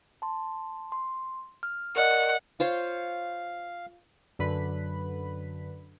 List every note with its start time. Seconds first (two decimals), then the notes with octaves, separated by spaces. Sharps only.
0.22 A5 C6
0.92 C6
1.63 F6
1.96 A#4 D5 D#5 F#5
2.60 F4 C5 C#5 F5
4.39 F#2 D3 B4 B5